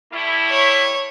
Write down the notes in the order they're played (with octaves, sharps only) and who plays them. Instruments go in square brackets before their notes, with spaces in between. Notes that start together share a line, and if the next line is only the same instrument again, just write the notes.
[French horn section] G3 A3 E4
[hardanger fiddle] C#5